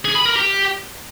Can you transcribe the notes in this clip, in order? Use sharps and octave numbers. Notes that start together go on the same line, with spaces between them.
G#4
B5
A#4
G4